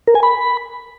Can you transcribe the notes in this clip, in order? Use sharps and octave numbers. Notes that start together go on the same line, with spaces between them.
A#4
G#5
B5